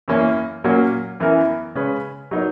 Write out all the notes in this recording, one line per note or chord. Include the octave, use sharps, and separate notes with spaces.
F#2 E3 A#3 C#4
A#2 F#3 A#3 C#4 F#4
F#2 E3 B3 E4 A#4
C#3 G#3 C#4 G#4 B4
F#3 B3 D#4 A#4 C#5